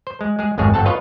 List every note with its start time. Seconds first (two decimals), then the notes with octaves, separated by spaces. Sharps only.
0.07 C5
0.21 G#3
0.39 G#3 G#4
0.58 G#1 F2 G#3 G#4 C#5
0.74 G1 C4 A4 F#5 A5
0.86 F4 B4 C#5 D#5 F5